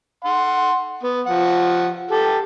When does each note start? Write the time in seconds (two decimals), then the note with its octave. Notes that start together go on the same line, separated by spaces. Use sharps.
0.24 F#5 C6
1.03 B3
1.27 F3 F#5
2.11 G4 A4